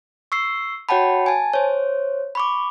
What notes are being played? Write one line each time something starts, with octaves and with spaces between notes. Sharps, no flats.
C#6 E6 C7
F#4 C#5 F#5 G5 A5 B5
G#5 A5
C5 C#5
B5 C#6 D6